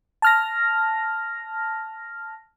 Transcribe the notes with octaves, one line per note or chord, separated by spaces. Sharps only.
A5 F6 A#6